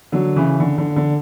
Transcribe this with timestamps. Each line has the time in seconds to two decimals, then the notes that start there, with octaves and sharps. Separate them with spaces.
0.12 D3 F#3
0.36 C#3 E3
0.60 D3
0.78 D3
0.96 D3